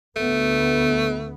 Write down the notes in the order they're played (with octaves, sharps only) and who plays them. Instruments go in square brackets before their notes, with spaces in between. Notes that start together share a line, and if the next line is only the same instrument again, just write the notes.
[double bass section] D2 B3 [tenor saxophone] A3